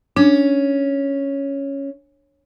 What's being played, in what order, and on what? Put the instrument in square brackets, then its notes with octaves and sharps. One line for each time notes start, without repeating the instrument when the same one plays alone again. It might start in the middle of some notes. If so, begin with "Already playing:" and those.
[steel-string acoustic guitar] C#4 [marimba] D4